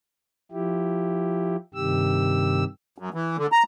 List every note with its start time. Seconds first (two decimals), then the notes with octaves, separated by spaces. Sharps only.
0.52 F3 E4 G4
1.74 G2 C3 D#3 G4 E6
2.98 F#2
3.14 E3
3.37 D3
3.52 A#5